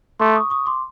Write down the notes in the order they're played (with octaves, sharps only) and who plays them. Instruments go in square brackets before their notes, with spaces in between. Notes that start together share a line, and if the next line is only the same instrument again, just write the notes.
[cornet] A3 [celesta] C6 D6
[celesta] C#6 D#6
C#6 D#6
C6 D6